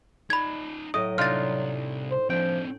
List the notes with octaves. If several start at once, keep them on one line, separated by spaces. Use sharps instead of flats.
D#4 D5 B5 G#6
A2 F#3 D#5 D#6
C2 D4 D#4 F4 F6 A6
C5
F3 C4 D4 G5